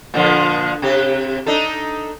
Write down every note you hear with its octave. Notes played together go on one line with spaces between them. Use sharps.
A#2 D3 F3
C3 G4
D4 D#4 A4